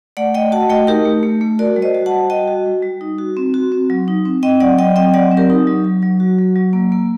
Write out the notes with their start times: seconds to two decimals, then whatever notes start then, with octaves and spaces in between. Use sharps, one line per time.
0.17 A3 D5 F#5
0.34 A3 D#5 G5
0.52 F#4 F#5 A5
0.69 A3 D#5 G5
0.87 D#4 G4 A#4
1.05 A3
1.23 A3
1.41 A3
1.59 F#4 A#4 D5
1.76 G3
1.82 C5 D#5
1.95 F#4
2.06 F#5 A5
2.12 G3
2.30 F#4 D#5 G5
2.48 F#4
2.66 G3
2.83 G3
3.01 D#4
3.18 F#4
3.37 C4
3.54 F#4
3.72 C4
3.90 F#3
4.08 D#4
4.25 C4
4.43 C4 D#5 G5
4.60 F#3 D5 F#5
4.79 F#3 D#5 G5
4.96 C4 D#5 G5
5.14 F#3 D5 F#5
5.31 C4
5.37 G4 A#4
5.50 D#4
5.67 F#3
5.85 F#3
6.02 F#3
6.20 F#4
6.39 F#3
6.56 F#3
6.73 A#3
6.92 A#3